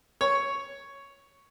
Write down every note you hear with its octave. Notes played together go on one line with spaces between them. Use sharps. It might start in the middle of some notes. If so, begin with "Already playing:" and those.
C#5